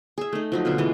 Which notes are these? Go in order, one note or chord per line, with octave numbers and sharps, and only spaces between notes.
G#4 E5
A3 D#4
F3 F#3 D#4
B2 D3 F4 E5
E3 G#3 F4